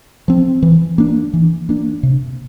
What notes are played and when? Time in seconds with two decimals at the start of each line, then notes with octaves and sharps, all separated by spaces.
0.28 F3 C4
0.62 E3
0.98 A#3 D4
1.33 E3
1.69 A#3 D4
2.03 C3